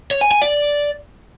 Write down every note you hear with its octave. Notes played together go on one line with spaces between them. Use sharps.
C#5
G#5
G#5
D5